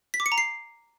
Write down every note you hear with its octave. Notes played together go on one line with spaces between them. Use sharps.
B6
D6
C#7
A#5
C7